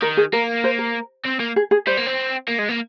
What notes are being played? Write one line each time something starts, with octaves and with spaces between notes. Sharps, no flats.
D#3 A#4
G#4
A#3 A#4
C5
A#4
C4
A#3
G#4
G#4
G3 C5
A#3
C4
A#3
G#3
A#3